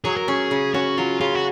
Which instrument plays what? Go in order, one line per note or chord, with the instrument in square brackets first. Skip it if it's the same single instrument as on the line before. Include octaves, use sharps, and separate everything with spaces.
[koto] F#3 [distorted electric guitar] G#4
[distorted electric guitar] A#4
[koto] C#4 [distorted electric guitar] G#4
[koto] C#3
[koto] C#4 [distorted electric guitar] F#4
[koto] F#3 [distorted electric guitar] F4
[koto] C#3 [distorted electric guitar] F4
[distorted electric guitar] F#4